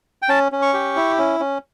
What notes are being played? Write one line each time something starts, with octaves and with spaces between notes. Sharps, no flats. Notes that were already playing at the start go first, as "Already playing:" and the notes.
G5
C#4 A5
C#4
C#6
G4
E4
C#4
C#4